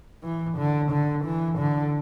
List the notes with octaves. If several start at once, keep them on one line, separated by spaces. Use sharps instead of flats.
E3
D3
D3
E3
D3